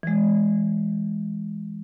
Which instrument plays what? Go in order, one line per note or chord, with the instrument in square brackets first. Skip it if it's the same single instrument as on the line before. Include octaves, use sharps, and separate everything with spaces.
[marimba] E3 G#3